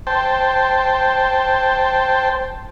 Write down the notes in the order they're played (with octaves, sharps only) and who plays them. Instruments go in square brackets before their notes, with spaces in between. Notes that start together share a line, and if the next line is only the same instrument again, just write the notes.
[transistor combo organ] C5 G5 A5